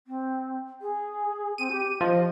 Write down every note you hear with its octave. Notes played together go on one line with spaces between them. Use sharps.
C4
G#4
C4 D#7
G4
F3 D#5